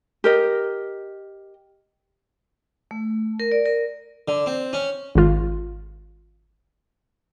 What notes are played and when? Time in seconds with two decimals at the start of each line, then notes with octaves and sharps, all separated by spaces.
0.24 G4 A#4 D#5
2.91 A3
3.40 A#4
3.52 D5
3.66 A#4
4.28 D3
4.46 C4
4.73 C#4
5.15 G#1 F4